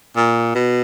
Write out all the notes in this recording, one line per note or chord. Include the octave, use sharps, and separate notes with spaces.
A#2
B2